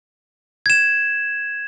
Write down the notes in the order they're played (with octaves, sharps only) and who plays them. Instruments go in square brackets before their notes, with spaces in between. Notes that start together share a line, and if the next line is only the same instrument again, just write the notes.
[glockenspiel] G#6 E7